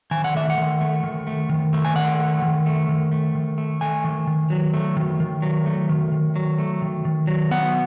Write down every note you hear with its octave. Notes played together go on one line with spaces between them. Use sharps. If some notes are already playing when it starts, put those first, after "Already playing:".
D#3 G#5
F#5
A3 E5
F#5
D#3
A3
D#3
A3
D#3
A3
G#5
D#3 F#5
A3
D#3
A3
D#3
A3
D#3
A3
A3 G#5
D#3
D#3
F#3
A3
D#3
D#3
F#3
A3
D#3
D#3
F#3
A3
D#3
D#3
F#3
B3 F#5